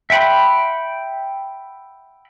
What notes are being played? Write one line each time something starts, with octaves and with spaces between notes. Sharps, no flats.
E5 F#5 G5 B5 C6